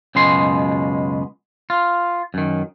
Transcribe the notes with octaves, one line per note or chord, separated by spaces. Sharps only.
C#2 F#2 B2 G#3 C6
F4
F#2 D#3